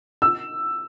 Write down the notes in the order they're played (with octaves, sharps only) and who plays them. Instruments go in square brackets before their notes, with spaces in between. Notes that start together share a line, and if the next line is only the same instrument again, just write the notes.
[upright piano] E6